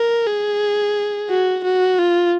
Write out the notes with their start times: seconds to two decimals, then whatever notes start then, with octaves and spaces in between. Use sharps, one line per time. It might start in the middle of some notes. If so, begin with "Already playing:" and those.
Already playing: A#4
0.27 G#4
1.30 F#4
1.64 F#4
1.99 F4